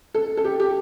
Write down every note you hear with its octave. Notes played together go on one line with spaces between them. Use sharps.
A4
A4
G4
G4